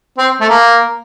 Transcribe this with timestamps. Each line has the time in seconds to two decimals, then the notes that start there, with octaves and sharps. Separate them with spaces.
0.18 C4
0.41 A3
0.49 A#3